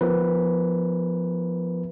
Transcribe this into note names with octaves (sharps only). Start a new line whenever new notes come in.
F3 B3 A#4 B4